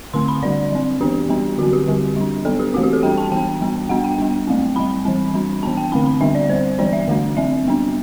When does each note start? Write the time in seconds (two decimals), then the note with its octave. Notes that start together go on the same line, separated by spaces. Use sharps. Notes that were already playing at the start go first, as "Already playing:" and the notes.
0.14 D3 A3 C4 C6
0.28 B5
0.43 D3 G3 D4 D5
0.72 F#3 C4
1.01 E3 B3 D4 G4
1.29 G3 B3 D4
1.58 D3 F#3 C4 F#4
1.73 G4
1.87 D3 G3 C4
2.16 G3 D4
2.45 F#3 B3 D4 A4
2.59 G4
2.74 E3 A3 C4 F#4
2.83 G4
2.93 A4
3.03 G3 D4 G5
3.18 A5
3.32 E3 B3 D4 G5
3.61 G3 B3 D4
3.89 G3 B3 D4 F#5
4.04 G5
4.19 G3 B3 D4
4.47 F#3 A3 C4
4.76 G3 C4 B5
5.05 E3 G3 C4
5.34 G3 D4
5.63 E3 B3 D4 A5
5.77 G5
5.92 D3 A3 C4 B5
6.06 B5
6.21 D3 G3 B3 D4 E5
6.35 D5
6.50 G3 C4 C5
6.79 E3 G3 B3 D4 D5
6.93 E5
7.08 D3 A3 D4
7.37 F#3 C4 E5
7.65 G3 B3 D4